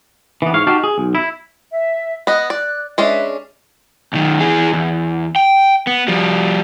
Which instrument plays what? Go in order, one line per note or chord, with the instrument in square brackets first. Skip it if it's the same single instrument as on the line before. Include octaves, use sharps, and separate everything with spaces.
[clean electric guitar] E3 B3
G#2 C#5 F5
D#4 F#4 G4 F5 G5 A5
G#4
B1
E4
[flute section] E5
[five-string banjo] B3 D#5 [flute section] F#6
[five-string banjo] D5
[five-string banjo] G#3 C#4 D4 [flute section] B4 E5
[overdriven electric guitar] B1 D#3
E3 G#4
E2
G5
B3
F3 G3